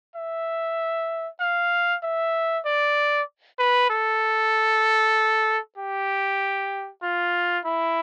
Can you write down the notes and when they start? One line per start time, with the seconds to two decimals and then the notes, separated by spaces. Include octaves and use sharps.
0.16 E5
1.40 F5
2.03 E5
2.65 D5
3.59 B4
3.90 A4
5.77 G4
7.03 F4
7.65 E4